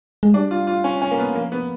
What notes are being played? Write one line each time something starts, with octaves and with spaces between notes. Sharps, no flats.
G#3
G3 D4
F4
F4
C#4
C#4
A#3
B3
F3 A#3
B3